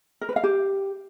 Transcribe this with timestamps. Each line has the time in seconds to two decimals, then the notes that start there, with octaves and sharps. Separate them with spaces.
0.21 A#4
0.29 B4
0.36 F5
0.43 G4